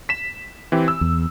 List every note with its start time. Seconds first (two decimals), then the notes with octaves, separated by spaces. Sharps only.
0.09 B6 E7
0.72 E3 C4 G4
0.88 E6
1.01 E2